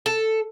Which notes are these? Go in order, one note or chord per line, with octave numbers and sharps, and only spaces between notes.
A4